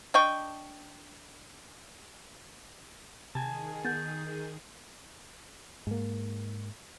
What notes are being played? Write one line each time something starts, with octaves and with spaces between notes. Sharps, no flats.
D4 D#5 G5 C#6
C3 D#3 G#4 G#5 A5
B3 F#5 G6 A6
G#2 A#3